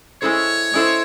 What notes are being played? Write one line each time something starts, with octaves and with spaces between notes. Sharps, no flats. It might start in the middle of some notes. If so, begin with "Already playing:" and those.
G#3 C#4 E4 A4 C5 C#5
G#3 C#4 E4 A4 C5